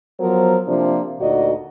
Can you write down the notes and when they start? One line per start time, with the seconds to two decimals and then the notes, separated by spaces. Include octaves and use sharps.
0.20 F3 F#3 B3 A#4 C5
0.68 C3 F3 A#3 D4
1.20 D2 A#2 D#4 F#4 D5 D#5